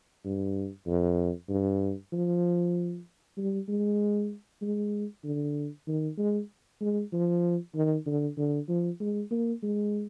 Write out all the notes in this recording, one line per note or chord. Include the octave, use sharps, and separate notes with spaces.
G2
F2
G2
F3
G3
G#3
G#3
D3
D#3
G#3
G#3
F3
D#3
D3
D3
F3
G#3
A#3
G#3